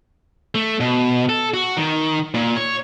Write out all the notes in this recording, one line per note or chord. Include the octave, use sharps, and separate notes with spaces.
A3
B2
A4
F#4
D#3
A#2
C#5